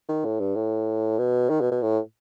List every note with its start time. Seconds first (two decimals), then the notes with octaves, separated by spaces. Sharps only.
0.09 D#3
0.25 A2
0.40 G2
0.56 A2
1.19 B2
1.50 D#3
1.61 B2
1.72 B2
1.82 A2